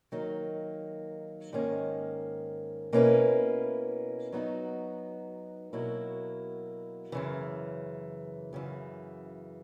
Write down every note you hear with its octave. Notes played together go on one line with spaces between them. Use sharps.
D#3 F#3 A#3 D#4
G#2 D#3 A#3 C#4
B2 A#3 C#4 E4 B4
F#3 B3 D#4 F#4
B2 F#3 A#3 E4
F#2 C#3 E3
F#2 C#3 E3